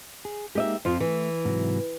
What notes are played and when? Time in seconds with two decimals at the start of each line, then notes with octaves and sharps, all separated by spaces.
0.25 G#4
0.55 G#3 A#3 D#4 G4 D#5 E5
0.85 F2 F4 C5
1.00 E3 A3
1.45 G#2 C3 F#3